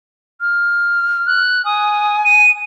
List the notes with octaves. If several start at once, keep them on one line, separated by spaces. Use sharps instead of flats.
F6
F#6
G#5 D#6
D#7